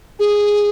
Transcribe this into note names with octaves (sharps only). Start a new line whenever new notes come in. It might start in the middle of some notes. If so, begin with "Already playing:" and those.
G#4